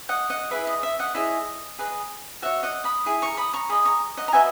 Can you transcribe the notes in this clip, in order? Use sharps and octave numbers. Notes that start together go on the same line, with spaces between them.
D#5 F#5
D#5 F#5
E4 G#4 B4 E5
D#5
E5
D#5 F#5
E4 G#4 C#5 D#5
G#4 B4 D#5
F#4 C#5 E5
D#5 F#5
B5 D#6
E4 G#4
A#5 C#6
B5 D#6
A#5 C#6
G#4 D#5 B5 D#6
A#5 C#6
D#5 F#5
A#5
F#4 B4 D#5 E5 G#5